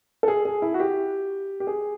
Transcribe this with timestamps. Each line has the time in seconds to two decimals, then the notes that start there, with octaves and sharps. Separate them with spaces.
0.23 A4
0.28 G#4
0.45 G#4
0.62 E4
0.74 F#4
0.80 G4
1.60 G4
1.67 G#4